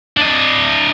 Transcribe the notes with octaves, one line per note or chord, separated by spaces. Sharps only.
D4 D#5